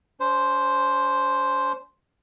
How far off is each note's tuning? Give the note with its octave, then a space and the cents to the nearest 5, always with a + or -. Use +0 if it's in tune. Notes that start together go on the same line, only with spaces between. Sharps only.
C#4 +45 C5 +0